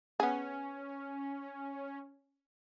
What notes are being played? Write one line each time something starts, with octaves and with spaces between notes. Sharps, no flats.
B3 C#4 G#4